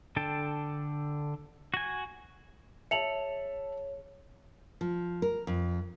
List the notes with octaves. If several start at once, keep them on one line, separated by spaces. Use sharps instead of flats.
D3 D4 A4 G5 A5
F#4 G#5
G#4 C#5 E5 A5 C#7 F7 F#7
F3
A#4
F2